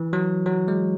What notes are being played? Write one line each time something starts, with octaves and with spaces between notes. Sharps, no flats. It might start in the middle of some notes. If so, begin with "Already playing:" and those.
Already playing: E3
F#3
F#3
G#3